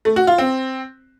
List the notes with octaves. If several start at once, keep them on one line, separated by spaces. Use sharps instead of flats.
A3
F#4
F4
C4